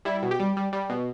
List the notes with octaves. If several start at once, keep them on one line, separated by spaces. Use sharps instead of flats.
G3 E4
B2
G4
G3
G3
G3
B2